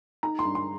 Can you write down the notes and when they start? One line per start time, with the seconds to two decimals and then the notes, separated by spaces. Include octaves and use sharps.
0.23 D#4 A#5
0.39 C6
0.45 G2
0.55 C6